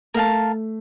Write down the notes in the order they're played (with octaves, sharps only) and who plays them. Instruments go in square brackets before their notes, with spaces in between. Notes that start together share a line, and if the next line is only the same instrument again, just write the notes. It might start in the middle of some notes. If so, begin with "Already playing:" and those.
[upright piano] A3 [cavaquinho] A#4 F5 A5